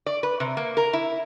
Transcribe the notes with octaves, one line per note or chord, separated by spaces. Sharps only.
D5
B4
C3
A#3
A#4
E4